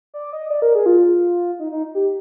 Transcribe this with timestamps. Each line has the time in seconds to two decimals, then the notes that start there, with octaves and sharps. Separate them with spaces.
0.14 D5
0.33 D#5
0.50 D5
0.62 A#4
0.75 G#4
0.86 F4
1.59 D#4
1.72 D#4
1.95 G4